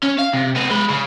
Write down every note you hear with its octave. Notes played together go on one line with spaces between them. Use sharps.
C#4
F5
C3
B3 C4
G#3 B4
C#3